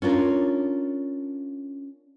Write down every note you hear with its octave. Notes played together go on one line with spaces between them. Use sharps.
C#4 D4 F4 A#4